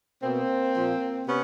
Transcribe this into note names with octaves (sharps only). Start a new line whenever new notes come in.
B2 A#3 C4
A#2 F3
C3 B3 C#4